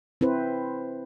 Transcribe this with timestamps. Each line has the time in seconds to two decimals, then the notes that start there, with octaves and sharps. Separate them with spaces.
0.21 C4 E4 B4 C5